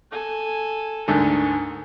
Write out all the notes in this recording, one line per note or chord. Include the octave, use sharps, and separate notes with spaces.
A4 G#5
D2 G#2 D3 A#4